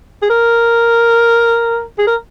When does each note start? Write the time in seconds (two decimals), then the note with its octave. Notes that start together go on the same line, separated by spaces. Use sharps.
0.22 G#4
0.30 A#4
1.98 G#4
2.07 A#4